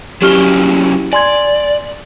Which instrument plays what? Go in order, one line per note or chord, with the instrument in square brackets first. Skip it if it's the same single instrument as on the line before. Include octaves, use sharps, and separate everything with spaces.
[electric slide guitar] F#3 C#4 E4 [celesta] G4 F6 G7
[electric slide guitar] D5 [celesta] G#5 C6 G#6